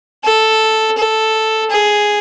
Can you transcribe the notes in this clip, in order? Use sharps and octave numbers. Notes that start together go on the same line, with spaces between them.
A4
A4
G#4